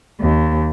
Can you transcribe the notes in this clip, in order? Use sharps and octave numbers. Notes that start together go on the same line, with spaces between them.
D#2